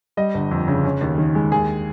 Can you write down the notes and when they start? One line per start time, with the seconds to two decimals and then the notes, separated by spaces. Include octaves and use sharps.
0.17 G3 D#5
0.34 G1
0.51 F2
0.68 C#3
0.85 C#4
1.01 D#2
1.18 D#3
1.35 G#3
1.52 D#2 G#4